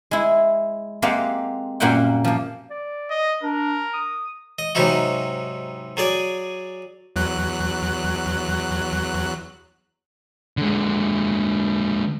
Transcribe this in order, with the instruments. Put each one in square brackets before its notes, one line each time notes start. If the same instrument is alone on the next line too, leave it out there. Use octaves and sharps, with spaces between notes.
[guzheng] G#3 E4
G#3 A#3 C4 G4 F5 F#5
F#2 A#2 G3 A#3 F#5 G5
F3 A#3
[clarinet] D5
[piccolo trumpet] D#5
[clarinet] D4 [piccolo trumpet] A#4
[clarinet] D#6
[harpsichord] D#5
G#2 C3 F#3 D#4 E4 F#4
F#3 G#4 D5 G#5
[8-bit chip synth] E2 F#3 F#6
[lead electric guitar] D3 G#3